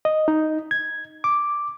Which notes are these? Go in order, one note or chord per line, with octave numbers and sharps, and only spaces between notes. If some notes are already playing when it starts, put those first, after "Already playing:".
D#5
D#4
G#6
D6